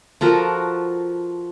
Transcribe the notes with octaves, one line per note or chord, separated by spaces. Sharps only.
F3 F#4 A4 A#4